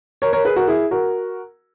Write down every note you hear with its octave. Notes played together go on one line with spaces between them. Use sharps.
A#4 C#5
A#4 C#5
G#4 B4
F#4 A#4
E4 G#4
F#4 A#4